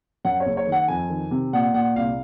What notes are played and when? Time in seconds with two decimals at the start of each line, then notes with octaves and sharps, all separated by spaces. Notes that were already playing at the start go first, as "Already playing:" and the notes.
0.25 F#2 F#5
0.40 C#5
0.46 F#1
0.57 C#5
0.67 D#3
0.72 F#5
0.88 F2 G#5
1.10 D#3
1.31 C3
1.53 A#2 F#5
1.74 A#2 F#5
1.96 C2 F5